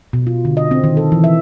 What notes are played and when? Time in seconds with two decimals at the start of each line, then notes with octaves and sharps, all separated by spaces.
0.13 B2
0.27 F4
0.45 D3
0.57 D#5
0.71 C4
0.84 D#3
0.97 A4
1.12 E3
1.24 E5